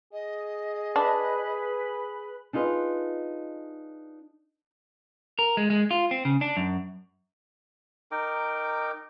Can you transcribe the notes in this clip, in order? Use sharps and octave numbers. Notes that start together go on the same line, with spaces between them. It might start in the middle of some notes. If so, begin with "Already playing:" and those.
G#4 D#5
D4 B4 B5
D4 D#4 F4 G#4 B4 D#5
A#4
G#3
G#3
F4
C4
C#3
D4
F#2
D#4 A#4 G5 D6